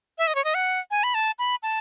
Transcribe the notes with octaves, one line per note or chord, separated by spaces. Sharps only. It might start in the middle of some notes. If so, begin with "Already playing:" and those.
E5
D#5
C#5
D#5
F#5
G#5
B5
A5
B5
A5